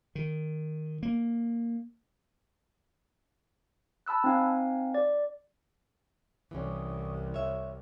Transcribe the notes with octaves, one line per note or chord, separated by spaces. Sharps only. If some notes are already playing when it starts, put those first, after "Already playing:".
D#3
A#3
A5 B5 E6 F#6
C4 D#4 F5 G#5
D5
C2 E3 C#4
C#5 E5